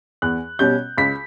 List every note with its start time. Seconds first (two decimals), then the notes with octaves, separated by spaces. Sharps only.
0.22 E2 F#6
0.59 B2 G3 C#4 G6
0.97 C#2 B6